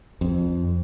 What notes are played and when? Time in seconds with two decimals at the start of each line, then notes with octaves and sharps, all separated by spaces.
0.21 F2